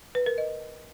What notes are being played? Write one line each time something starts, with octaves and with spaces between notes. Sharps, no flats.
B4
A#4
D#5